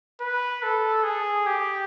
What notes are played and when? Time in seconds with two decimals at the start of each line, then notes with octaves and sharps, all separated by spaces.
0.21 B4
0.63 A4
1.04 G#4
1.47 G4